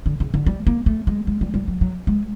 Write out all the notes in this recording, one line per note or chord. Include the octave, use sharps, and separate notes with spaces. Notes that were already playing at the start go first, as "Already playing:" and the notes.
D3
C#3
D3
G3
A#3
A3
G#3
G#3
G3
G3
F#3
F#3
G#3